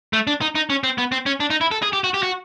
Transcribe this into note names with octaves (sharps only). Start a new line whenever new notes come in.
A3
D4
D#4
D#4
C#4
C4
B3
C4
C#4
D4
D#4
E4
A4
G#4
G4
F#4
G4
F#4